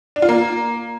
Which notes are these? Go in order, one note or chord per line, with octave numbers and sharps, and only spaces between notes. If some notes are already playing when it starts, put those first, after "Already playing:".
D4
F4
A#3